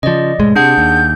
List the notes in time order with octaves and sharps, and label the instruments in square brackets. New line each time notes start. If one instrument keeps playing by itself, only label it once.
[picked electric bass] C#3 F3 [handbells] D5 D#5
[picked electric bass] F1 A2 G#3
[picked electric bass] C3 [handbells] D4 G#4 F#5 [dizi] G6
[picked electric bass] D#2